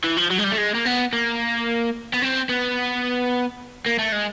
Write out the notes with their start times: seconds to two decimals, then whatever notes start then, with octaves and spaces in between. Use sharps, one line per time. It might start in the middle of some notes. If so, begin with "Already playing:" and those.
0.04 E3
0.17 F3
0.31 F#3
0.39 G#3
0.44 G3
0.52 A3
0.58 G#3
0.75 A#3
0.86 B3
1.13 A#3
2.13 B3
2.22 C4
2.49 B3
3.86 A#3
3.99 A3
4.12 G#3